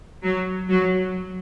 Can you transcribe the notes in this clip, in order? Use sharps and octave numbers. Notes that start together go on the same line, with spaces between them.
F#3
F#3